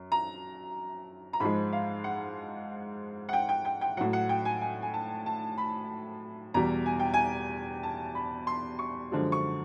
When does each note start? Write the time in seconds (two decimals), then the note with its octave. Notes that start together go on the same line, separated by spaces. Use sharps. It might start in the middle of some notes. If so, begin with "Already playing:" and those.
Already playing: F#2
0.12 A#5
1.33 A#5
1.40 G#2 F3 G#3 B5
1.73 F5
2.04 F#5
3.29 F#5
3.33 G5
3.49 G5
3.65 G5
3.81 G5
3.97 A2 F#3 F#5
4.13 F#5
4.29 G5
4.45 G#5
4.61 G#5
4.82 G#5
4.94 A5
5.26 A5
5.58 B5
6.54 E2 B2 G3 A#5
6.86 G#5
7.00 G5
7.14 G#5
7.83 A5
8.15 B5
8.47 C6
8.79 C#6
9.12 F#2 D3 F3 G#3
9.32 C#6